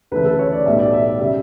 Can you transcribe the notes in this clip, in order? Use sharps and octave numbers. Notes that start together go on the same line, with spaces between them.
D2 C#3 E3 A3 B4
A4
C#5
D5
B1 A2 G3 B3 E5
D5
E5
D5
C#3 G3 E5